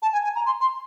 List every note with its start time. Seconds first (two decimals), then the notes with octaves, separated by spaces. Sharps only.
0.02 A5
0.13 G#5
0.24 G#5
0.35 A#5
0.46 C6
0.60 C6